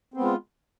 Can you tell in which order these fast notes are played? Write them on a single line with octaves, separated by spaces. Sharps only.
C4 B3 G#3 F4